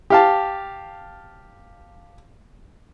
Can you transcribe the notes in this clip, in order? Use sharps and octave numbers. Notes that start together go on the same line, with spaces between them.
G4 F5 A5